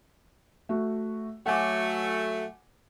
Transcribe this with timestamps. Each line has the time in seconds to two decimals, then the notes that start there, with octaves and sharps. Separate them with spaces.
0.69 A3 F#4
1.46 F#3 A3 F#5 G#5 D6